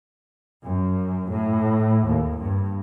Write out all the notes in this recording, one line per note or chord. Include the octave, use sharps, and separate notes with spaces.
F#2
A2
D#2
G2